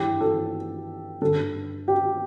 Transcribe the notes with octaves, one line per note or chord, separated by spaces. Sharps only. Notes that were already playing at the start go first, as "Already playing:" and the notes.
Already playing: G2 E3 G4
A4
G2 D3 A4
G4